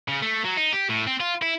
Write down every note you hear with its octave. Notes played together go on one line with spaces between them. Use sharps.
C#3
A3
F#3
D#4
G4
A2
C4
F4
E4